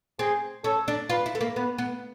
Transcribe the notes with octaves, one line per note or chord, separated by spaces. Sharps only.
C4 G#4
C#4 A4
D4
F4 B4
E4
A3
A#3
B3 B4
B3